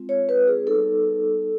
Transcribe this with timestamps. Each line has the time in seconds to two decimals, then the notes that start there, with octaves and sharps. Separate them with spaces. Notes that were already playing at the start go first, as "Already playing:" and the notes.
Already playing: G#3 C4 F4
0.09 C#5
0.29 B4
0.48 G#4
0.67 G3 B3 D#4 A4